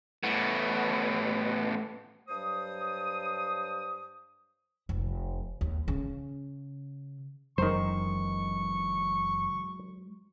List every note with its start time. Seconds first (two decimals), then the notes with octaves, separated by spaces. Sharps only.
0.23 A2 B3
2.28 G2 F#3 C5 D#6
4.89 F1
5.61 D#2
5.88 C#3
7.58 F#1 F#2 D#3 E3 F#3 G#3 C5 C#6